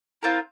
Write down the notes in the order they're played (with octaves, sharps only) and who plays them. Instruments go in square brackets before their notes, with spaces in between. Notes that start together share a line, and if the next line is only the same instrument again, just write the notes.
[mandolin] C4 F4 A#4 [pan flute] E4